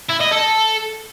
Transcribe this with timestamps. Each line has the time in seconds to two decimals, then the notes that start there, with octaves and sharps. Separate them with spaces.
0.10 E4
0.21 D#5
0.32 A4